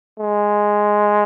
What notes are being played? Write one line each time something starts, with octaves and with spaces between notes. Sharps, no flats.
G#3